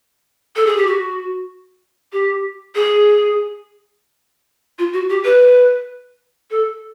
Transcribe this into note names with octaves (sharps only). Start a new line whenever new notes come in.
A4
G#4
G4
F#4
G4
G#4
F4
F#4
G4
B4
A4